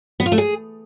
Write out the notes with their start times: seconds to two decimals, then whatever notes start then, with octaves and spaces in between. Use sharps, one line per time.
0.20 B3
0.26 F4
0.32 A3
0.38 G#4